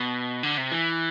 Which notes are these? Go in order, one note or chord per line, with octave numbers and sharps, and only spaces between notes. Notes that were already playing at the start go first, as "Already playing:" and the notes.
Already playing: B2
D3
C3
E3